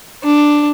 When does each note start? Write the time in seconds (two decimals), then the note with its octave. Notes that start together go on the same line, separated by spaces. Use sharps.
0.24 D4